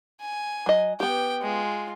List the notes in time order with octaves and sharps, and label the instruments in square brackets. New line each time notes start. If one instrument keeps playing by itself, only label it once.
[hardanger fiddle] G#5
[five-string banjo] F#3 D#5
[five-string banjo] B3 G4 [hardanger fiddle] G5
[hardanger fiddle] G#3 F4